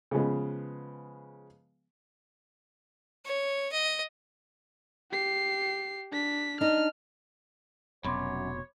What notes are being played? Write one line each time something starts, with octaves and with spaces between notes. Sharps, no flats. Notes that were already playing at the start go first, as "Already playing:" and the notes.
C#3 F3 G#3 B3
C#5
D#5
G4 C7
D4 B6
D4 D#4 F6
F1 F#2 B2 C#5 B5 C6 D6